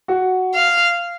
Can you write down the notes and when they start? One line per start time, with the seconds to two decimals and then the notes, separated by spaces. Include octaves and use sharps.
0.08 F#4
0.54 F5